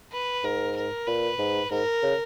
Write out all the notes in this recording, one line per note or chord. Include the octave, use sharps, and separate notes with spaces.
B4
G#2 A#4
A#4
A#2 B4
G#2
G#2 A#4
C#3